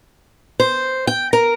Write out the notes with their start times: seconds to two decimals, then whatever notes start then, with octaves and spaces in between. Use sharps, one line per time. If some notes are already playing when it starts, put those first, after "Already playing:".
0.60 C5
1.07 G5
1.33 A#4